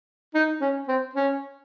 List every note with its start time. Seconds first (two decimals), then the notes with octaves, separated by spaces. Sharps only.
0.35 D#4
0.61 C#4
0.89 C4
1.15 C#4